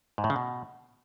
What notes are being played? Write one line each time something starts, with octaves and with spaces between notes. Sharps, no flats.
G#2
A2
C#3
B2